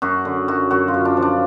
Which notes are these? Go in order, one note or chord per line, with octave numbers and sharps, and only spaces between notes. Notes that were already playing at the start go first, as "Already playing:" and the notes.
F#2 F#4
D3
F#2 F#4
F#2 F#4
F4
F#2
D4
F3
D4